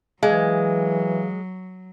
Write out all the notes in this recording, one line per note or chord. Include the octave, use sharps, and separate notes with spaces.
E3 F#3 G#3 G#4 F5